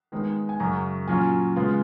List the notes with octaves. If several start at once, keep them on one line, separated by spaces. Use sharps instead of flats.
D#3 G#3 B3 D#4
G#5
F#2 C#3 F#3 A#5
A#2 F#3 C#4 F4 G#5
C#3 G#3 B3 F4